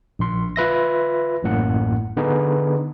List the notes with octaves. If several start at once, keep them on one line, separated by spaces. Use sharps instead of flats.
A#1 C6
F4 B4 E5 A#6
A1 F#2 A2 A#3 F#5
D3 B3 D#4 G#4 B4